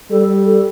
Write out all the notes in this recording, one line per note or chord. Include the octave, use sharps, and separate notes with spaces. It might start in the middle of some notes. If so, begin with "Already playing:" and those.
G3 A4
A4